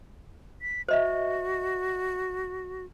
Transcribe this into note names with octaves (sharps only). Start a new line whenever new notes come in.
B6
F#4 C5 D#5 E5